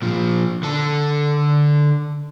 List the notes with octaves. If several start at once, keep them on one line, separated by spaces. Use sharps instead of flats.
A#2 F3
D3 A4